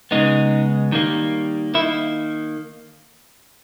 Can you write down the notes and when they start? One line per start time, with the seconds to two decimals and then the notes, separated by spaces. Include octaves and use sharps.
0.11 C#3 G#3 B3 D#4
0.92 D#3 G3 A#3
1.74 D#3 A#3 E4